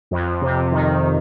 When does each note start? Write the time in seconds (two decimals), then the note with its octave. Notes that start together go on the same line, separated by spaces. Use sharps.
0.11 F2
0.42 C3
0.72 D#3